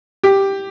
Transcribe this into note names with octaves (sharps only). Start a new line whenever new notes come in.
G4